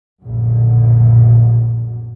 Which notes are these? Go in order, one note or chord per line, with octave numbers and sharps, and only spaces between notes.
A#1 F#2 B2 D3